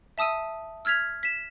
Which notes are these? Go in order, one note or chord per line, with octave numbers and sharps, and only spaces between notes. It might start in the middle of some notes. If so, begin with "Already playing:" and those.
E5 A5 D#6 E6 D#7
E6 F6 G#6 B6 F7
B6 E7